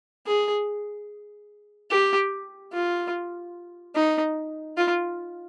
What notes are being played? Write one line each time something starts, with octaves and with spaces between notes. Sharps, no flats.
G#4
G4
F4
D#4
F4